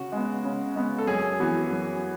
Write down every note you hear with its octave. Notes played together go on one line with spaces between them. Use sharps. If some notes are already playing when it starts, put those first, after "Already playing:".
Already playing: C#3 F#4
G#3 B3
C#3
G#3 B3
A4
F#2 G#4
E3 B3 F#4
F#2